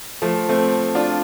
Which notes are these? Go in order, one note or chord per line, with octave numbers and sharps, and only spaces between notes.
F3 A3
A3 C4
D4 F4